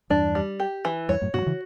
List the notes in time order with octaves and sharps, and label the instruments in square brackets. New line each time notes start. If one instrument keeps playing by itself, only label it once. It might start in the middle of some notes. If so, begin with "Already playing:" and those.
[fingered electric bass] E2 G2 [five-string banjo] D4
[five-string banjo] G3
G4
E3
[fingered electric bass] E2 G2 [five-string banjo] C#5
[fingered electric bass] F#2 A2
[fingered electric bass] G2 B2 [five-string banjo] F#4
[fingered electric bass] F#3
C#3 E3